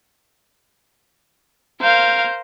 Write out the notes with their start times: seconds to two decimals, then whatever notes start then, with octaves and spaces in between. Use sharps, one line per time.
1.80 A#4 C5 F5 G6